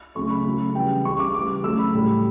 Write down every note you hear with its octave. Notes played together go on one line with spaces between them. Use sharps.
C#3 F#3 A3 C#6
B5
C#3 F#3 A3
C#3 E3 G3 G5
C#3 G3 C#6
D6
C#3 E3 G3 D6
C#3 F#3 A3 E6
B5
A2 G3